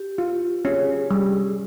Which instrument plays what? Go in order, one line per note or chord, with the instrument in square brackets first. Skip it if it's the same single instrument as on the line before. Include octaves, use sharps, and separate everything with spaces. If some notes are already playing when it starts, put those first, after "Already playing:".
Already playing: [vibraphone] G4
[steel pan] F4
[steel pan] C#4 [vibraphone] G#4
[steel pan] G3